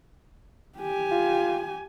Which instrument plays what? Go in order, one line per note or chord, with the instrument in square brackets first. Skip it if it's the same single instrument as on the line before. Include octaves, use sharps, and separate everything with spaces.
[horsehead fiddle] G4 G#5
[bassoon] F4